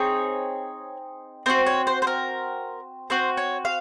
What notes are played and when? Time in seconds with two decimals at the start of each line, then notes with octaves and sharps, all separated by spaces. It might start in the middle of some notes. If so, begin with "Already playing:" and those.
Already playing: C4 D#4 G#4 C#5
1.46 C4 D#4 F#4 C5
1.66 C#5
1.87 C5
2.02 C5
2.07 A#4
3.10 C4 F#4 C5
3.37 C#5
3.65 F5